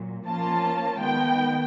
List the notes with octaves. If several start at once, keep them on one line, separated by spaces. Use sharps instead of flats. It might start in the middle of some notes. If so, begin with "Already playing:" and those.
Already playing: A#2 F#3
F3 A#3 C#4 F4 A5
D#3 G#3 B3 G5